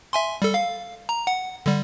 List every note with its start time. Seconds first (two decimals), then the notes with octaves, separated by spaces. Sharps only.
0.13 E5 G#5 C6
0.42 G3 A4
0.54 F5
1.09 A#5
1.27 F#5
1.66 D3 G3